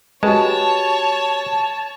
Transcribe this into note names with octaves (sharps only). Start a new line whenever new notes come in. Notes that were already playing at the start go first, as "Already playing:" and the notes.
G#3 F#4 G4 B4 C#5 A5